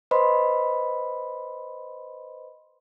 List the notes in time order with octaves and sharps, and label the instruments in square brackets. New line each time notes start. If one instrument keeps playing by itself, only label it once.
[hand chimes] B4 C5 D#5 B5 C6